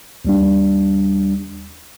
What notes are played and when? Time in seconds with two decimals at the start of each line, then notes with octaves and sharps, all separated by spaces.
0.25 D#2 G3 D4